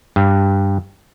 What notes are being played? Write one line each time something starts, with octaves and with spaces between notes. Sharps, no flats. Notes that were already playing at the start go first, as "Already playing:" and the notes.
G2